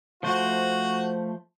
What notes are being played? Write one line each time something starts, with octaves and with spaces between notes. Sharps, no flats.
F3 A3 F#4 C5